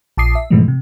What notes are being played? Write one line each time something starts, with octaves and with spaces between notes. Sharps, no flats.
A#1 A5 D6 D#6 C7
E5
G#2 B2 E3 F3 G#3 A3
C3